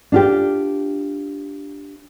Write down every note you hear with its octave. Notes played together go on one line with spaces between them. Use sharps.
D4 F4 G4